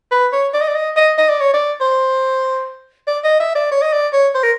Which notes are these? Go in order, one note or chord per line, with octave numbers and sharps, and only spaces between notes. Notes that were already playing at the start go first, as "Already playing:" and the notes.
B4
C#5
D5
D#5
D5
D#5
D#5
D#5
D5
C#5
D5
C5
D5
D#5
E5
D5
C#5
D#5
D5
C#5
C5
A#4